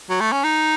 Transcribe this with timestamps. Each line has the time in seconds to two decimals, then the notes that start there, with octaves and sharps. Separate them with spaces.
0.09 F#3
0.20 A3
0.32 C#4
0.44 D#4